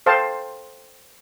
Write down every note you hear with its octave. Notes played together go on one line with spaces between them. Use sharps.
A4 C5 F5 G5 A5